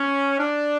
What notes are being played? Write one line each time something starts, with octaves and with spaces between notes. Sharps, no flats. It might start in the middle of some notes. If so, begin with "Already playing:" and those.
Already playing: C#4
D4